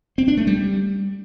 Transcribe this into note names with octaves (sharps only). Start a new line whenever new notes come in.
C4
D4
A3
G3